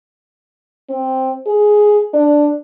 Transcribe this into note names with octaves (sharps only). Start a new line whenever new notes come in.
C4
G#4
D4